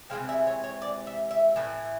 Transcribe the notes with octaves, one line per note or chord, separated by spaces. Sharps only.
C3 E3 G#3 C4 F5
E5
C#5
C#5
D5
E5
E5
A2 E3